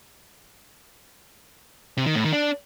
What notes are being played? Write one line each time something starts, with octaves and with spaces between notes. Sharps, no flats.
C3
D#3
A2
D#3
D4